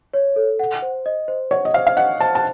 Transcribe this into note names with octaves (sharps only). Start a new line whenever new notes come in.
C#5
A4
F#5
C5
D#5
C5
C#5 F#5
D#5
C5 F5
F5
D#5 F#5
C5 A5
A5